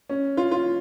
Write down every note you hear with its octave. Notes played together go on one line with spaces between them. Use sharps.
C#4
F4
F4